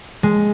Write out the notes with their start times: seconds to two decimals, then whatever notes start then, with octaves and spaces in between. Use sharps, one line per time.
0.23 G#3